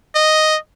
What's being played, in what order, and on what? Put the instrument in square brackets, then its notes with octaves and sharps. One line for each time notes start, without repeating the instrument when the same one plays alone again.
[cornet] D#5